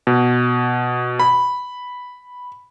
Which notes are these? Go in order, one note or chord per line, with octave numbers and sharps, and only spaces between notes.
B2
B5